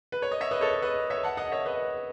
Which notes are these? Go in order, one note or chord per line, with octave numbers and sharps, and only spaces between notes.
B4
C#5
D#5
C#5 E5
B4 D#5
A4 C#5
B4 D#5
C#5 E5
F#5 A5
D#5 F#5
C#5 E5
B4 D#5